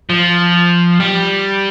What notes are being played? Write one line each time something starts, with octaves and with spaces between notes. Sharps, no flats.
F3
G3